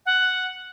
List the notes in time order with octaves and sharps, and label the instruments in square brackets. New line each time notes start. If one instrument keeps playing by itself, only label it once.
[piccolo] F#5